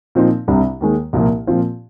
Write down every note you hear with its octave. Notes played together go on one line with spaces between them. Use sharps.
A#2 F3 C4 D#4
C2 C3 G3 D4
D#2 D#3 G#3
C2 A#2 F3 A#3
A#2 F3 C4 F4